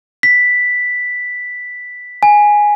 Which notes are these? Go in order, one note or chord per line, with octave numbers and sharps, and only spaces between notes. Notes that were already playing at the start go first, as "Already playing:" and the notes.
B6
G#5